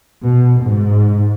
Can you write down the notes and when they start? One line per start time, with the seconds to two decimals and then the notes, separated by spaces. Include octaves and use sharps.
0.23 B2
0.62 G#2